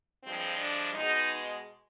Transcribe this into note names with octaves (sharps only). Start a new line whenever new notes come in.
G2 F3 G#3 C4
D4
B2 G#3 D#4